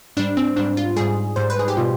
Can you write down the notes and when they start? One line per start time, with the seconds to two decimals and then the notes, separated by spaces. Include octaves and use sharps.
0.17 G#2 G3 D4
0.37 C4
0.56 G#2 G3 D4
0.77 F4
0.96 G#2 G3 G#4
1.36 G#2 G3 C5
1.50 B4
1.59 G#4
1.68 G4
1.77 B2 G3 F4